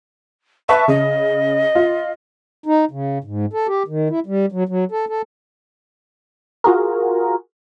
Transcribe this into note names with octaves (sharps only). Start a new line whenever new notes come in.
B4 E5 A5 C#6
C#3 D#5
F4
D#4
C#3
G#2
A4
G4
D#3
E4
G3
F#3
F#3
A4
A4
F4 F#4 G#4 A#4